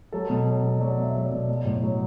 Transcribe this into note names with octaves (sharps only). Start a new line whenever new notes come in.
F#3 A4
B2
F#3
B2
F#3 D5
B2
E5
F#3
D5
B2
F#3 D5
A2
F#3